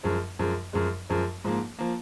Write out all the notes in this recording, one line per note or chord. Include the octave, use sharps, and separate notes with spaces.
F#2 F3 G#3
F#2 F3 G#3
F#2 F3 G#3
F#2 F3 G#3
G#2 F3 A#3
F3 A#3